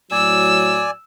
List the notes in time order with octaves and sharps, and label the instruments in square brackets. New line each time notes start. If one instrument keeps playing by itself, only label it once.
[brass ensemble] A2 F#3 [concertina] D5 G#5 [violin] E6